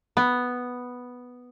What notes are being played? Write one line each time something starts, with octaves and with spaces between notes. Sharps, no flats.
B3